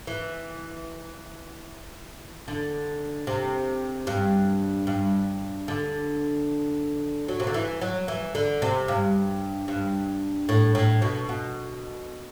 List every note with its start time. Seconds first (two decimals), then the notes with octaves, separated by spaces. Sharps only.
0.07 E3
2.48 D3
3.27 C3
4.07 G2
4.87 G2
5.68 D3
7.28 F#3
7.40 C3
7.47 D3
7.54 E3
7.81 F#3
8.08 E3
8.35 D3
8.62 C3
8.88 G2
9.68 G2
10.49 A2
10.75 A2
11.02 B2
11.29 B2